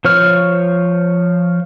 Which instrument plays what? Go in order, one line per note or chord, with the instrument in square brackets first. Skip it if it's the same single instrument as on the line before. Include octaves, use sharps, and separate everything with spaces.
[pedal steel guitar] F3 C5 C#5 F6